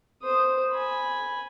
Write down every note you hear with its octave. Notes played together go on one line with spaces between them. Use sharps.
C5 D#6
G#5 B5